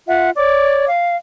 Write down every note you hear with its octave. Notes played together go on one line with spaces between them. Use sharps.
F4 E5 F#5
C#5 D5 D6
F5